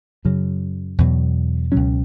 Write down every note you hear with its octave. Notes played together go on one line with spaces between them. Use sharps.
F#2 C#3 F#3
E2 B2 F#3
C#2 B2 F#3 C#4